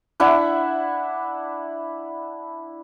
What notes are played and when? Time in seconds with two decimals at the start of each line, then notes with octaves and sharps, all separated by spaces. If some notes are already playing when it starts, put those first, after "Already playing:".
0.20 D4 E4 E5 F#5